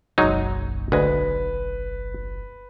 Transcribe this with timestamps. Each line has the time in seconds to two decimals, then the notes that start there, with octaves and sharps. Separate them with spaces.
0.18 F#1 B1 F#3 G#3 D#4
0.92 D2 G#3 B4